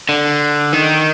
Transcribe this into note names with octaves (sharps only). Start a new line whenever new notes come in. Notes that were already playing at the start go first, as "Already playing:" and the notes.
D3
D#3